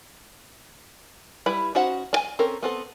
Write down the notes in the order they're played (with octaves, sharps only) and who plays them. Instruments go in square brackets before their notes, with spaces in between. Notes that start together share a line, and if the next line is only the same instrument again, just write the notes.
[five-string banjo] G3 E4 B4 B5
C#4 D#4 F#4 C5 F#5
D4 G#5
C4 C#4 A4 A#4
B3 C4 A4